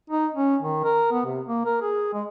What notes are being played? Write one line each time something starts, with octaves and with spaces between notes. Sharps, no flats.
D#4
C#4
D#3
A#4
B3
C3
A#3
A#4
G#4
G#3